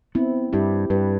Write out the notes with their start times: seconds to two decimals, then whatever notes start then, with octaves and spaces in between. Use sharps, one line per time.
0.15 B3 C4 E4
0.53 G2 E4 G4
0.90 G2 G4 B4